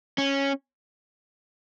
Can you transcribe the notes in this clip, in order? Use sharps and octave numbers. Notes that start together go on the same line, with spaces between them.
C#4